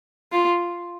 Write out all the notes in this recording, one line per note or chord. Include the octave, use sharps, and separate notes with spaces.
F4